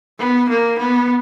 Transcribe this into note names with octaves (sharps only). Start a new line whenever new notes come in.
B3
A#3
B3